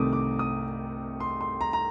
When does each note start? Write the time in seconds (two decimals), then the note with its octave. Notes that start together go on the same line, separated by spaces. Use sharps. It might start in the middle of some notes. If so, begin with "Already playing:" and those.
Already playing: C2 C3 D#3 A3 C4 D6 D#6
0.13 D6
0.39 D#6
1.20 C6
1.41 C6
1.61 A#5
1.73 A#5